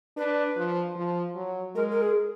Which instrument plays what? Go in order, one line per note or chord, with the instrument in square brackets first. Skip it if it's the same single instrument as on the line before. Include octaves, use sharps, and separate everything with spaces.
[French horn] D4 [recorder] B4
[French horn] F3
F3
F#3
[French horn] G#3 [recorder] A#4
[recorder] A#4
G#4